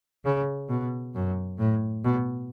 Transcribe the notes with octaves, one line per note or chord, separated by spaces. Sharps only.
C#3
B2
F#2
A2
B2